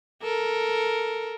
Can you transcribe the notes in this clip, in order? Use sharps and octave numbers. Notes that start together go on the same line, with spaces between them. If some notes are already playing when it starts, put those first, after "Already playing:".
A4 A#4